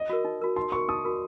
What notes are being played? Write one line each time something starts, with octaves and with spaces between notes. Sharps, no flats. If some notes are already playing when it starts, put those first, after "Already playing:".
Already playing: D#5
F#4 A#4
D#4
F#4 A#4
D#4 C6
F#4 A#4 C#6
D#4 D#6
F#4 A#4